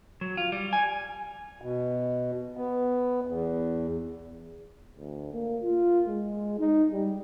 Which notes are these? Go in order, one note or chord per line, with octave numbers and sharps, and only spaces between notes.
F#3
F4
G3
G#5
B2
B3
E2
D2
A#3
F4
G#3
D#4
G3